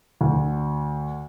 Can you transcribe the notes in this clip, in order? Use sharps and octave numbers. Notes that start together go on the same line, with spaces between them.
D2